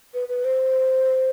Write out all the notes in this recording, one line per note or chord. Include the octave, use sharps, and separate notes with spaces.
B4
B4
C5